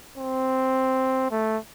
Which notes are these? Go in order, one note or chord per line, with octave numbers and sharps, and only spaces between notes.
C4
A3